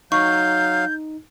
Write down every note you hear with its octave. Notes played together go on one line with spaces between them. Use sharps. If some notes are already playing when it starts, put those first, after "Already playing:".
F#3 D#4 F5 C#6 G6